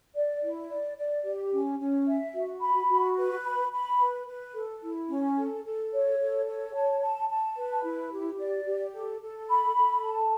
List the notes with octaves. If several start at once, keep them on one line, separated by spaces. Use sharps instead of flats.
D5
E4
D5
D5
G4
C#4
C#4
E5
F#4
B5
F#4
B4
B5
B5
B4
B4
A4
E4
C#4
A4
A4
C#5
A4
C#5
A5
A5
A5
B4
E4
G4
D5
G4
A4
A4
B5
A4
A5